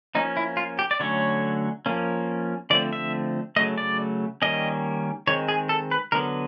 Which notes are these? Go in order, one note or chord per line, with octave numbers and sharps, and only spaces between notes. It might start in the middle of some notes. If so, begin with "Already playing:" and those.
F3 A#3 C#4 D#4
E4
F4
G4
D5
D3 F#3 A3 C#4 C#5
F3 A#3 C#4
D3 F3 A3 C4 D5
E5
C#3 F#3 A3 D#5
D5
D#3 G3 A#3 C#4 D#5
D#3 G#3 C4 C#5
G#4
A4
B4
D3 F#3 B3 A#4